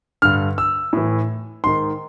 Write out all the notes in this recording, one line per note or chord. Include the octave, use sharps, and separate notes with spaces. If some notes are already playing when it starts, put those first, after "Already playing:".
G2 D3 F6
E6
A2 E3
G#2 D#3 C6